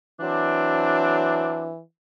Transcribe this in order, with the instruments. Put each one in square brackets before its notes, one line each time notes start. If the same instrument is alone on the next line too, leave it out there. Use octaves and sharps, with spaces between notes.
[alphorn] E3 [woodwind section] F#3 C4 D4